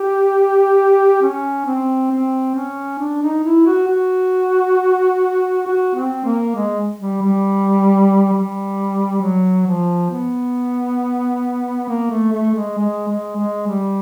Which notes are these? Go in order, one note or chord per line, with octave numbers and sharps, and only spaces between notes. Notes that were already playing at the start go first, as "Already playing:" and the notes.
Already playing: G4
C#4
C4
C4
C#4
D4
D#4
E4
F#4
F#4
F#4
C4
A#3
G#3
G3
G3
G3
F#3
F3
B3
A#3
A3
A3
G#3
G#3
G#3
G#3
G3